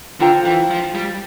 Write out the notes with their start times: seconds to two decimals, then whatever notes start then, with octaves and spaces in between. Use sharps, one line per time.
0.20 D3 F4 C5 G5 A#5
0.45 E3
0.70 F3
0.95 G3